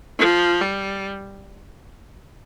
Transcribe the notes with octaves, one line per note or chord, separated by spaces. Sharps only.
F3
G3